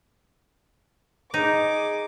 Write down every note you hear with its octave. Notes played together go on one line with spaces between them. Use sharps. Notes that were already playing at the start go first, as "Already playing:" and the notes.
D#4 G#4 D#5 D6